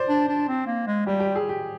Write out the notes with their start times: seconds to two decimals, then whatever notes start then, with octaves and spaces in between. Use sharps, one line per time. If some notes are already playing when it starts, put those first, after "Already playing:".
Already playing: C5 D5
0.09 D4
0.29 D4
0.48 C4
0.67 A#3
0.87 G#3
1.06 G3 G4
1.20 G4
1.36 G#4
1.49 G4